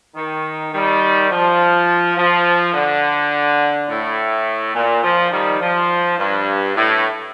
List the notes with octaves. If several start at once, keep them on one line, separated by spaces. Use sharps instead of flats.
D#3
D#3 G3
F3
F3
D3
A2
A#2
F3
D#3 G3
F3
G2
A2